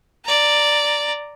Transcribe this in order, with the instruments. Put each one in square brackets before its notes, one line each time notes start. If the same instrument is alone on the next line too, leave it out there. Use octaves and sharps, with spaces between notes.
[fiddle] D5 A#5